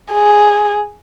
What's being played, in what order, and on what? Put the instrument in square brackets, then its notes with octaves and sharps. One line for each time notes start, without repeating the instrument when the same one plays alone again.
[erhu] G#4